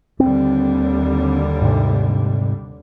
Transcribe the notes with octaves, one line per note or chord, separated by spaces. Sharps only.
D#2 D3 G3 C4
G#2 C3